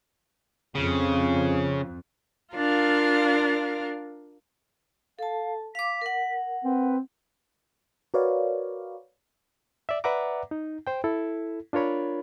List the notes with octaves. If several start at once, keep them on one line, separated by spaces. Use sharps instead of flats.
F2 C#3
D4 F4 A#4 F5
A4 F5 A5
F5 D6 B6
A#4 F#5
C4 B4
F#4 A#4 B4 C#5 D5 F5
D5 E5
B4 D5 E5 F#5 A#5 D6
D#4
C5 G5
E4 A4
D4 F4 A#4 C#5 B5